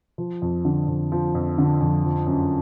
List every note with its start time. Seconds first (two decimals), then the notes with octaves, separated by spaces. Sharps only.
0.18 F3
0.42 F2
0.65 D3
0.88 F2
1.12 F3
1.35 F2
1.58 D3
1.81 F2
2.04 F3
2.27 F#2